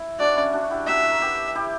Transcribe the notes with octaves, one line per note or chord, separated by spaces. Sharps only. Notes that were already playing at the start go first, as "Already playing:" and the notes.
Already playing: E4
D4 F#4 D5
C#4 E4
D4 F#4
E4 G4
F#4 A#4 E5
A#4
G4 B4
E4 G4